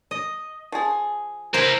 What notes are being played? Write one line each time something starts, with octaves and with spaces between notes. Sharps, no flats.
D#5
F3 G#4
E4 A#4 C5